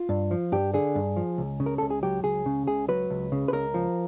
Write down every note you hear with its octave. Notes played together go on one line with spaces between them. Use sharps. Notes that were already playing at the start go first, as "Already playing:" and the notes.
Already playing: F4
G2
F3
G2 G4
D3 G#4
G2
F3
C#2
C#3
A#4
C#2 A4
G#4
F#3 G4
C#2 G#4
C#3
C#2 G#4
F#3 B4
C#2
C#3
B4
C#2 A#4
F3